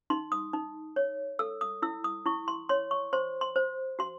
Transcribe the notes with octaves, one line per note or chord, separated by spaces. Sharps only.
D#4 C6
D#6
D#4
C#5
A4 E6
D#6
E4 E6
D#6
E4 C#6
C6
C#5 C6
C#6
C5 C6
C6
C5
F#4 C6